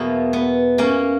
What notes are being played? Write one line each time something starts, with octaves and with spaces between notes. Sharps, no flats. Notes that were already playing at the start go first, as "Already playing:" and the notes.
Already playing: E2 B2 F#3 A#3
B3
A#3 C#4